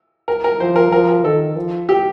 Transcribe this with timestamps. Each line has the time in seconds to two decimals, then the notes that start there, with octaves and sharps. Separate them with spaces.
0.28 A#4
0.44 A#4
0.59 F3 C5
0.76 A#4
0.92 F3 A#4
1.08 A#4
1.24 D#3 A4
1.56 F3
1.89 G4